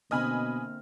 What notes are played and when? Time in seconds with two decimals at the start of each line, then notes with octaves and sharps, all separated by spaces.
0.11 B2 D3 A#3 C4 D#5 G#5 B5 F6